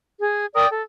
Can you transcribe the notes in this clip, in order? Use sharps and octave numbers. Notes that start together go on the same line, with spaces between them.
G#4
A#4 D5 G5 D#6
A4